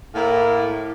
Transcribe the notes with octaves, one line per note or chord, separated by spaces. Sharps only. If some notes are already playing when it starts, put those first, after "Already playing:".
A2 A#3